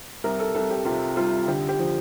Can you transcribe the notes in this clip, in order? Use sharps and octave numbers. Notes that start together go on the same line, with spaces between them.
C2 A#4
A4
C2 A4
G4
C3 F4
G3 F4
D3 G4
G4
F3